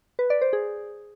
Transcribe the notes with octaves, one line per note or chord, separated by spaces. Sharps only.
B4
D5
C5
G#4